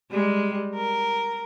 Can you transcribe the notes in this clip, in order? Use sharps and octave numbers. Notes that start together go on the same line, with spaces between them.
G3 G#3
A#4